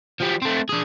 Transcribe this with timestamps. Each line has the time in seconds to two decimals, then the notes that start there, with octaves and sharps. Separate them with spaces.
0.20 F3 G3
0.42 A3 C4
0.69 D4 G#4